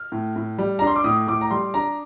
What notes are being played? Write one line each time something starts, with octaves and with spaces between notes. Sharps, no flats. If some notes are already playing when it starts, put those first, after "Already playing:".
Already playing: F6
A2
A2
G3
D4 A#5
C6
D6
A2 D#6
A2 D6
A#5
G3 C6
D4 A#5